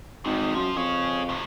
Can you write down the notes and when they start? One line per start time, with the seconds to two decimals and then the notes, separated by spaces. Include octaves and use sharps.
0.25 G#1 E2 D#3
0.55 F#2 F3
0.76 F2 G#4 C#5
1.29 A2 C3